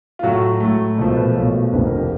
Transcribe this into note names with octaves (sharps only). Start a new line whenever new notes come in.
F4
A2 F#3 A3 F#4
A2 F#3 A3
B1 A#2 F3 A3
B4
B1 A#2 F3 A3 C#5
F1 D#2 D3 F3 B4
A#4
G4